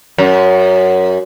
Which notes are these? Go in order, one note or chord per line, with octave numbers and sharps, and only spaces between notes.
F#2